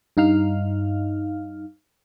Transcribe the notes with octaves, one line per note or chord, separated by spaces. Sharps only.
G2 D#4 F5 F6